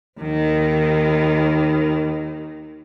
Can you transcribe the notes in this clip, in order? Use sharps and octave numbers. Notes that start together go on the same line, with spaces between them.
D#2 D#3